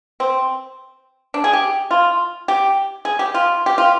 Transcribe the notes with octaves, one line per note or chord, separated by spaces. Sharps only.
C4
D4
G#4
G4
F4
G4
G#4
G4
F4
G4
F4